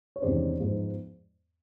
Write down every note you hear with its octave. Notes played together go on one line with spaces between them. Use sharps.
C#5
E2 C3 D#3 G#3 C#4 C5 D5
G#2 F3 G#3 B3